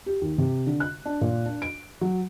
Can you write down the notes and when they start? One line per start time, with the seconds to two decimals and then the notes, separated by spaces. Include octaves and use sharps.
0.06 G4
0.21 D#2
0.38 C3
0.67 D3
0.80 F#6
1.06 D4
1.21 A#2
1.46 D4
1.62 D7
2.01 F#3